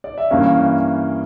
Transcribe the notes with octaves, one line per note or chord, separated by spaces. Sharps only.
D5
E5
G2 E3 A#3 C#4 F5